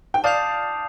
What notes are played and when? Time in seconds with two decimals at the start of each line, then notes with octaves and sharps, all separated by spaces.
0.14 G5
0.24 D5 F5 A5 D#6 G6 C7 F7